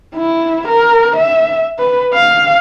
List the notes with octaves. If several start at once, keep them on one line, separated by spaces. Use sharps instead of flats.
E4
A#4
E5
B4
F5